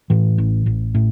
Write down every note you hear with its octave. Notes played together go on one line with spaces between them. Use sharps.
A2 E3
A1
A1
A2